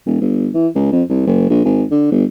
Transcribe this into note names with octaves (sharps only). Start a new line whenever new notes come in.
E1
G1
E3
C#2
F2
C2
F#1
A#1
G#1
D3
G1